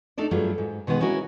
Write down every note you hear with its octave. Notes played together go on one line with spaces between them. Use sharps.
A3 D4 D#4 A4 D5
G2 F#3 A3 F4 G#4
G#2
B2 D#3 G#3 B3
G#3 C#4 E4 F#4 A#4